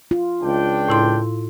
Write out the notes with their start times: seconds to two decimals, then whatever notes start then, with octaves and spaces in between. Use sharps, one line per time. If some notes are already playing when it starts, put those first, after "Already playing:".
0.11 F4
0.41 C#2 D4 G5
0.88 A2 E4 C6